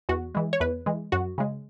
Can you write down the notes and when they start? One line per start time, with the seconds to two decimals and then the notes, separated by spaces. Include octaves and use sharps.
0.09 E2 F#4
0.35 E3 G#3
0.53 C#5
0.60 E2 B4
0.86 E3 G#3
1.12 F#2 F#4
1.38 C#3 G#3